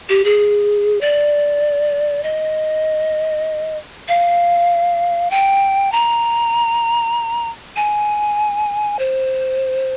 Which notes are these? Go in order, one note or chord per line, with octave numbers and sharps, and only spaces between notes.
G4
G#4
D5
D#5
F5
G5
A#5
G#5
C5